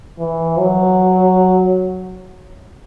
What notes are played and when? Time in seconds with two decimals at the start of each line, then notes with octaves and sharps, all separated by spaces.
0.19 E3
0.59 F#3